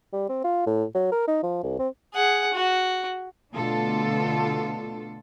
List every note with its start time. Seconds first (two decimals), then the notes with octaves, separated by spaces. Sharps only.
0.13 G3
0.29 C4
0.44 F4
0.66 A2
0.94 F#3
1.12 A#4
1.27 D#4
1.43 F3
1.63 C2
1.79 C4
2.14 G#4 F#5
2.54 F#4
3.53 B2 D3 A3 D4 F4 A4